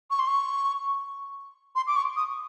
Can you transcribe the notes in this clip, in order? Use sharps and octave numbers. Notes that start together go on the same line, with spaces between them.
C#6
C6
C#6
C6
D6
C#6
D#6